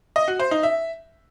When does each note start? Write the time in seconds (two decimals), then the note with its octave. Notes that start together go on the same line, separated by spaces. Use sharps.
0.16 D#5
0.28 F#4
0.40 C5
0.51 D#4
0.63 E5